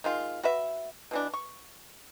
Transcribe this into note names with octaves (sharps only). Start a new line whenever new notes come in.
D#3 G#3 F4
F#4 B4 E5
B2 E3 D4
C#6